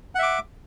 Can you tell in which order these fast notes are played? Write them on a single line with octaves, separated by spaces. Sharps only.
F#5 E5 D6